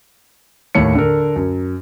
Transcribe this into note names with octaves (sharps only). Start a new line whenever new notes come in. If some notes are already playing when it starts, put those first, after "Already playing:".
D#2 A2 C#5 C#7
D3 A#4
F#2